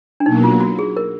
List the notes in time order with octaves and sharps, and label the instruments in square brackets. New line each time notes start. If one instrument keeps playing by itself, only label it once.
[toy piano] D4
[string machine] B2 F#3 A#3 [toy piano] D#4
[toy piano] F4
F#4
G#4
A#4